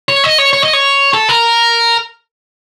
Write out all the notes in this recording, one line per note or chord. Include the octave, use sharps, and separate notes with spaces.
C#5
D#5
C#5
C#5
D#5
C#5
A4
A#4